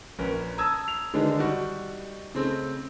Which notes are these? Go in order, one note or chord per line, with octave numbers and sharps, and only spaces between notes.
A#1 C#4 A#4 B4
A5 A#5 D#6 E6 G#6
F7
D3 D#3 G#3 D4 D#4 B4
G3 D#4 F#4
C#3 A3 C4 D#4